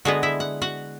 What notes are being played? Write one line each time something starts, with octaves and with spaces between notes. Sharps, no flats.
D3 G#3 B3 F#4 F#5
E4 E5
F#5
F#4 F#5